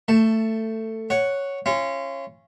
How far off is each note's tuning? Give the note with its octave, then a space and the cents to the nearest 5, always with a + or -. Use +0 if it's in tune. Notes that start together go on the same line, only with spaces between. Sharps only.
A3 +15 A5 +0
C#5 +0 F#5 +0
C#4 -20 F4 -35